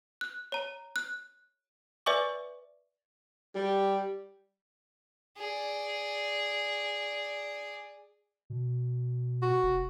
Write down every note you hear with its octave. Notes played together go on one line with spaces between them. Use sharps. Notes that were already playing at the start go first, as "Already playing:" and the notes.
F#6
C#5 A#5
F#6
B4 D5 E5 G#5 C#6 D6
G3 G4
G#4 D5
B2
F#4
F1